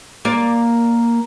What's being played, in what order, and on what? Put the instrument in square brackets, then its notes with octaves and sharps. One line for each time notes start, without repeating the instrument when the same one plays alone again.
[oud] A#3 D5